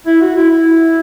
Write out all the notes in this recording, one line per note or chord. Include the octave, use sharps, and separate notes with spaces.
E4
F#4
E4
E4